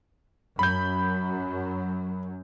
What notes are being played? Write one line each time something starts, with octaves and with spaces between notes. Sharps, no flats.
F#2 F#3 B5 G6